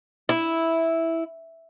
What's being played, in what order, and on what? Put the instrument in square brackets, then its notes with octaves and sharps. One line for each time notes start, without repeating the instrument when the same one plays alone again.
[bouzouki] E4